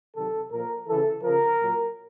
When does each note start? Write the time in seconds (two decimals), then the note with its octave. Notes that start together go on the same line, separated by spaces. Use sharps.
0.16 C3 D#3 F#3 A4
0.51 A#2 F3 A#4
0.87 C#3 E3 A4
1.22 C#3 F3 A#4
1.59 A#2 F#3